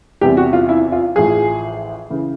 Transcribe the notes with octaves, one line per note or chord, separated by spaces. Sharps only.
E2 C3 E3 G3 G4
F#4
F4
E4
F4
A1 A2 F3 G#4
C#3 E3